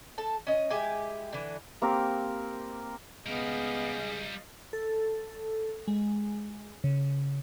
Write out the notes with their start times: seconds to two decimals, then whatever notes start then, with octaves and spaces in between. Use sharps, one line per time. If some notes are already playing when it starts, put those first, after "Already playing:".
0.18 A4 A5
0.47 C#4 D#5
0.70 G#3 E4 G4 G#5
1.33 D3 E3
1.82 A#3 C4 G4 A#4
3.26 C#2 G3 B3 G#4 A#4 D#5 F5
4.73 A4
5.88 G#3
6.84 C#3